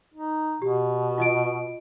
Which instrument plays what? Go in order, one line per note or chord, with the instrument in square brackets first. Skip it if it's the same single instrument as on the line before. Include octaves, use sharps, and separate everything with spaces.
[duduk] D#4
[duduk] B2 [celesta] G4
[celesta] F4 D#5 D7